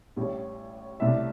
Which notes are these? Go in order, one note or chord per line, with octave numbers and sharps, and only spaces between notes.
A1 A2 G3
C2 C3 A3 D4 E5